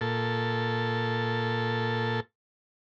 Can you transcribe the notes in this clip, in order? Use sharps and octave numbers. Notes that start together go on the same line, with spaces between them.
A#2 A4